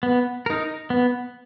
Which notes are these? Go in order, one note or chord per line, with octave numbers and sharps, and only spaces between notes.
B3
D#4 A#4
B3